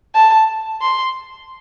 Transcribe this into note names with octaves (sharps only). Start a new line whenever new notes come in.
A5
C6